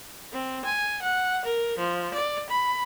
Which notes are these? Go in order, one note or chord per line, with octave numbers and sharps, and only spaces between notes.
C4
G#5
F#5
A#4
F3
D5
B5